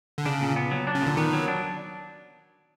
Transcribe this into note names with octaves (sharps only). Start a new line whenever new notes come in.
D3
C#3 D4
A#2
B3
F#3
D4
C#3
A#2 D3
D#3 B3
F#3
D4